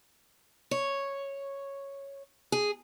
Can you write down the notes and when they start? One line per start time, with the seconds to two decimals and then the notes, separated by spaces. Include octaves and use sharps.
0.71 C#5
2.52 G#4